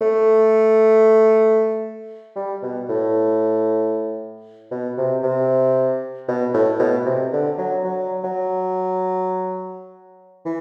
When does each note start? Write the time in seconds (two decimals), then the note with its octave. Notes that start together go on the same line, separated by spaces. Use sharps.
0.01 A3
2.36 G3
2.63 B2
2.89 A2
4.71 B2
4.97 C3
5.23 C3
6.28 B2
6.54 A2
6.80 B2
7.06 C3
7.33 D3
7.58 F#3
7.84 F#3
8.24 F#3
10.45 E3